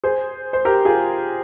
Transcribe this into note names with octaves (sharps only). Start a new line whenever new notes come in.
G#4 C5
C5
G4 A#4
F4 G#4